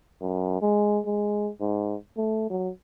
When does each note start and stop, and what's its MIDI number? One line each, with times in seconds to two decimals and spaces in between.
0.21 0.58 42
0.62 1.00 56
1.06 1.51 56
1.61 1.96 44
2.17 2.49 57
2.50 2.70 54